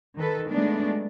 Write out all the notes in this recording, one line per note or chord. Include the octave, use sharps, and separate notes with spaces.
D#3 A4 B4
F#3 G#3 A3 B3 D4